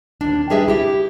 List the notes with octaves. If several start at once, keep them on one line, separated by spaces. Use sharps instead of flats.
D#2 D4
G3 D4 G4 G#4 B4 E5
E4 G4